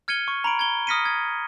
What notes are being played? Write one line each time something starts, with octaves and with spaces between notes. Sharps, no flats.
F6 G#6 C#7 D#7 G7
C#6
A#5 B5 D7
G#6 G7
D#6 F6 A#6 B6 C#7 D#7
G#6